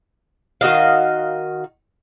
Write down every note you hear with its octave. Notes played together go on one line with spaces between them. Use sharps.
D#3 F#4 D#5 F5